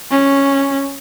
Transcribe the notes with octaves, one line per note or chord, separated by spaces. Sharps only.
C#4